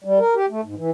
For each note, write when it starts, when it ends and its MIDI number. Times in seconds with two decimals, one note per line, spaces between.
0.04 0.19 55
0.19 0.34 70
0.35 0.46 67
0.50 0.61 57
0.64 0.75 44
0.77 0.91 52